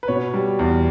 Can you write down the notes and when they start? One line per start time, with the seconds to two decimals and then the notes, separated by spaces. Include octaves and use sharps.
0.03 B4
0.08 B2 C#5
0.34 G3
0.59 E2